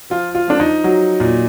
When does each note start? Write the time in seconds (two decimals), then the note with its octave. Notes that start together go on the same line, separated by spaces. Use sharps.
0.10 F3 F4
0.35 F4
0.47 F3 D4
0.60 D#4
0.84 F#3
1.20 A#2